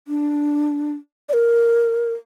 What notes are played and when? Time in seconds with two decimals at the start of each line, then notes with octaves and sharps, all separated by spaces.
0.08 D4
1.29 D5
1.33 A#4